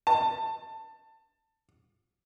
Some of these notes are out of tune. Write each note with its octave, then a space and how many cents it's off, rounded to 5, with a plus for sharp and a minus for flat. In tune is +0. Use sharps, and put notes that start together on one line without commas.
A5 +20